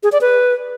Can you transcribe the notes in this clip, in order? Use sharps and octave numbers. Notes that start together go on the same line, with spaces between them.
G#4
D5
B4